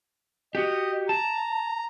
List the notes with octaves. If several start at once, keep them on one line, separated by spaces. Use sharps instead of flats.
F#4 G4 D#5
A5 A#5